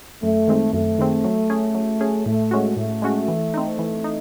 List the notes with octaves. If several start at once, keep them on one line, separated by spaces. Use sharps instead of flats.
F#2 A3
D#3 G#3 C4
F#2 A3
D#3 G#3 C4
F#3
C#4 G#4
F#3
C#4 G#4
A2 A3
G#3 C#4 F#4
A2 A3
G#3 C#4 F#4
E3
C4 D#4
E3
D#4